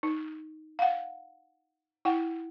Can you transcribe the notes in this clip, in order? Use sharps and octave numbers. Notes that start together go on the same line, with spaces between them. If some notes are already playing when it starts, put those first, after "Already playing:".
D#4
F5 F#5
E4 F#5 G5